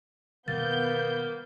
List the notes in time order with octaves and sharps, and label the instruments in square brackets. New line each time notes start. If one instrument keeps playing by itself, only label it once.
[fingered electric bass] B2 D#3 G3 [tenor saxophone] A#3 [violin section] B3 G6 [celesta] A6